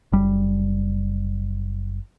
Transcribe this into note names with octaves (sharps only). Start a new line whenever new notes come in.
F#1 G3